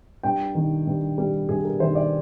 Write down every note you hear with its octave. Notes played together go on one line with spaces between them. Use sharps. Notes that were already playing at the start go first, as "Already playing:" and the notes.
G2 G5
D#3
G2
G3
G2 G#4
A#4
D#3 C5
D5